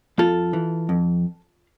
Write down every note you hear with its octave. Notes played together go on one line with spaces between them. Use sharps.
F2 F4 A4
E3
F2